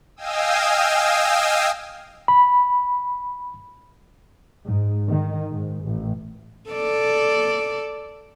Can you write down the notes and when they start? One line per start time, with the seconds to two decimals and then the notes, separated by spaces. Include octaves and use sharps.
0.16 D#5 F5 G5 G#5 D#6 E6
2.28 B5
4.65 G#2
5.09 D#3
5.51 G#2
5.85 A1
6.70 A4 D5